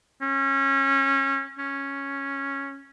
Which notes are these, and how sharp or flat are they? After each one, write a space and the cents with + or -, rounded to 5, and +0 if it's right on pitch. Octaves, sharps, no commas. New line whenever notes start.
C#4 -25
C#4 -5